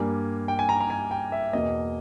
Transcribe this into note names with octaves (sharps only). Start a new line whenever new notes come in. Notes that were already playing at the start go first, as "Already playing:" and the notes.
Already playing: G2 G3 A#3 G#5
G5
G#5
A#5
A#5
G#5
G5
E5
E2 B2 A#3 D#5